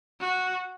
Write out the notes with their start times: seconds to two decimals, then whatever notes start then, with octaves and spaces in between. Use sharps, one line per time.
0.21 F#4